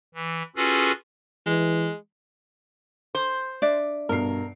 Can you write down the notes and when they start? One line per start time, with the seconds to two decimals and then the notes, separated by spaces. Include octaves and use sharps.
0.14 E3
0.56 C#4 F4 F#4 G#4 A4 B4
1.47 E3 G#3
3.15 C5
3.62 D4 D5 E5
4.09 G2 B2 A#4 C7